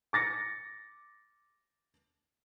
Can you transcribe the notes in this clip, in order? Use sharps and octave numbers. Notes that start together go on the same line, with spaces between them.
D6 A6 A#6 C#7